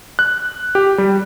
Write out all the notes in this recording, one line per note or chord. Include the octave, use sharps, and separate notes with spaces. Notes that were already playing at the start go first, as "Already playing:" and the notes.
F#6
G4
G3